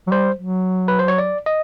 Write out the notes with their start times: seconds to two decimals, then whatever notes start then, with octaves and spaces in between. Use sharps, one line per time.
0.07 F#3
0.11 G3 C5
0.39 F#3
0.88 B4
0.99 C5
1.08 C#5
1.18 D5
1.46 D#5